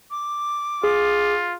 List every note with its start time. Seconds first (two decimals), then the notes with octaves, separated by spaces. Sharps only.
0.11 D6
0.84 F4 G#4